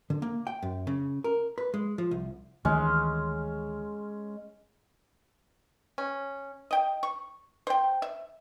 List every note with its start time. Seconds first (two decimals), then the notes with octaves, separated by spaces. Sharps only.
0.10 D3
0.22 A#3
0.47 G5
0.62 F#2
0.87 C#3
1.24 A#4
1.58 B4
1.74 G#3
1.98 F3
2.11 C2
2.65 D2 D#3 E3 G#3 C#4
5.98 C#4
6.71 D#5 G5
7.03 C#6
7.67 C5 G5
8.02 E5